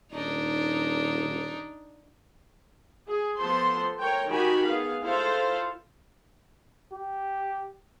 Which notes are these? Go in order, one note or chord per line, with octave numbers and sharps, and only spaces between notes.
D#1 D4 D#4
G#4
F3 B3 A4 C5 C6
A#4 C#5 G5
D#3 F#4 G4 G#5 B5
B3 G#4 F5
E4 F4 A4 C5 F5
G4